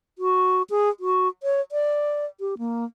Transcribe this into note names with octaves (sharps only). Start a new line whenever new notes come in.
F#4
G#4
F#4
C#5
D5
G4
A#3